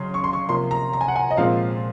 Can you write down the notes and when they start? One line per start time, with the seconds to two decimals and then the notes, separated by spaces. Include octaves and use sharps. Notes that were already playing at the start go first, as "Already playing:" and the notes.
Already playing: C#3 F#3 C#4 C6
0.14 C#6
0.24 C6
0.33 C#6
0.49 C3 F3 A#3 C6
0.71 A#5
0.93 A#5
1.01 G#5
1.08 F#5
1.16 G#5
1.30 D#5
1.37 A#2 F3 G#3 C4 F5